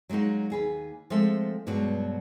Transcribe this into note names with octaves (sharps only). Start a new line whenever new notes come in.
F#3 G#3 A#3 D#4 F#4
D#2 G#4 B4
F3 G#3 A3 C4 A4 E5
G2 B2 F#3 G#3 F#4